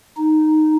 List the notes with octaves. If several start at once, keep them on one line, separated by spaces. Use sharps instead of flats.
D#4